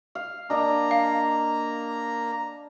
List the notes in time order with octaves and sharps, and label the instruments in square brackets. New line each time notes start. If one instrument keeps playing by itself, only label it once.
[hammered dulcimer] F5
[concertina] A#3 A#5 [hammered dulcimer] D4 D#5
[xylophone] F5